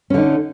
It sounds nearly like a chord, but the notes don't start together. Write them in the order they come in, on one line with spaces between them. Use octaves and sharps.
C#4 D3 D#4